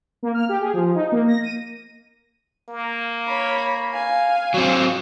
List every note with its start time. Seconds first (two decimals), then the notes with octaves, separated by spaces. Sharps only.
0.23 A#3
0.34 F6
0.49 G4
0.61 G#4
0.74 F3
0.95 D#4
1.12 A#3
1.28 A#6
1.43 D#7
2.69 A#3
3.27 C#5 B5
3.93 F5 G#5
4.54 F#3 C4